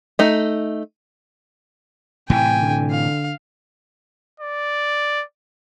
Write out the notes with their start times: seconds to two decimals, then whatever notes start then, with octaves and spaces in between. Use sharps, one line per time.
0.19 A3 D#4
2.30 A2 C3 E3 G5 G#5
2.62 D3
2.91 F5
4.40 D5